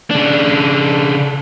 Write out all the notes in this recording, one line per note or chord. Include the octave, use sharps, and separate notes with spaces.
C#3 D4